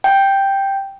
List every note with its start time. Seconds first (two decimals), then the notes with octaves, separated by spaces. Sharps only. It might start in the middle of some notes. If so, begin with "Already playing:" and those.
0.04 G5